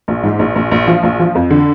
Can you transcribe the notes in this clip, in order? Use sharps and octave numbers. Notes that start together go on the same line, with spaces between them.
A#1
G#2
A#1
A#1
A#1
F3
A#1
F3
F2
D3